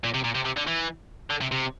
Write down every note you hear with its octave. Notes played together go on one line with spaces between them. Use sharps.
A#2
C3
A#2
C3
C3
D3
E3
D3
C3
C3